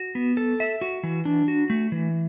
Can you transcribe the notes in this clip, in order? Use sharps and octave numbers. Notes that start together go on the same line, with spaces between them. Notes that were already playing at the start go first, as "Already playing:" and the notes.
Already playing: F#4
B3
A4
E5
F#4
E3
D4
F#4
A3
E3